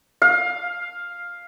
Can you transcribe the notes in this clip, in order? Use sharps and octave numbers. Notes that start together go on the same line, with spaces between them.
F5